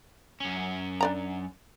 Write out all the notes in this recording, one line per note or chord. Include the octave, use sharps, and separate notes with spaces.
F#2 C#4
D4 D5 A#5